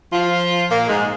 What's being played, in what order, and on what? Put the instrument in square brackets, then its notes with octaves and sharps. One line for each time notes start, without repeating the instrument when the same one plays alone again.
[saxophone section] F3 F4
A#2 A#3
G#2 G#3